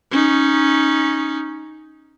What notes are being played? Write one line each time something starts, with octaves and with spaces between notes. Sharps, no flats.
C#4 D#4